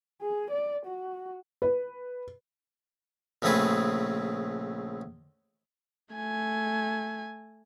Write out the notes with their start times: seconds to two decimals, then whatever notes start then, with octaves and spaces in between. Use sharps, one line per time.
0.21 G#4
0.51 D5
0.86 F#4
1.62 B4
3.42 A#1 C#3 A3 C4 G#4 B4
6.15 A3 G#5